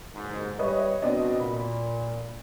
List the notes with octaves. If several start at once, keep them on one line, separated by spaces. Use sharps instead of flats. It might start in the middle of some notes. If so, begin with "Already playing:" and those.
F#1 D#2 G#2
G3 B4 C#5 D#5 E5
B2 C4 D4 D#5
A#2 B5